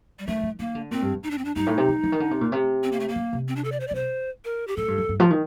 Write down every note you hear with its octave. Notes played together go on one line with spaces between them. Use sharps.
G3
D#3 A3
D#3
D#3 A#3
D3
A#2 C4
G2
F2
D#4
D4
C4
D4
G2 D#4
A2
C3
D#3
D3
D#3
D3
C3
A#2
C3
C4
A#3
A3
A#3
D3
C3
C4
D4
A4
D5
C5
D5
C3 C5
A#4
G4
A2 A4
G2
F2
G2
F3
D#3